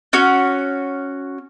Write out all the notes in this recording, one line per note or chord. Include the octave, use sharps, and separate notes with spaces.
C#4 F#4